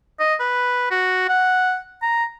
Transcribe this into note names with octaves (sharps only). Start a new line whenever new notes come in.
D#5
B4
F#4
F#5
A#5